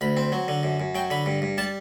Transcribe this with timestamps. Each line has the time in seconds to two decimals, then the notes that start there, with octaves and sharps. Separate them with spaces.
0.01 D2 B5
0.17 C4
0.32 F#3
0.48 D3
0.63 F#2
0.80 F#2
0.95 F#3 G5
1.10 D3 B5
1.26 G2
1.42 G2
1.58 G3 A5